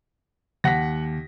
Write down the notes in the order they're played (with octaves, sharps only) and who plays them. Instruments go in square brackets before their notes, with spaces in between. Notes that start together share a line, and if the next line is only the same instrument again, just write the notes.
[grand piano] D#2 B6 [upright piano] F#5 A#6